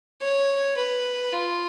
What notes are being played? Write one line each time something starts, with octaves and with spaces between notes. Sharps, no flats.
C#5
B4
F4